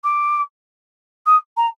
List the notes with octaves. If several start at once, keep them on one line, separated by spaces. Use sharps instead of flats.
D6
D#6
A#5